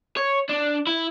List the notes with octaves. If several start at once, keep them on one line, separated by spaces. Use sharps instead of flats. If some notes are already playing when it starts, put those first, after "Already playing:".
C#5
D4
E4